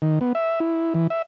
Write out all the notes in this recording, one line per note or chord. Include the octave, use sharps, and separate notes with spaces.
D#3
B3
E5
E4
E3
E5